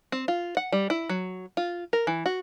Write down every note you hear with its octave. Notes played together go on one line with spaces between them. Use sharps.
C4
F4
F#5
G3
E4
F#3
F4
A#4
E3
F#4